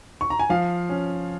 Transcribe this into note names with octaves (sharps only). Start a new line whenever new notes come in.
C#6
A#5
G#5
F3 F5
C#4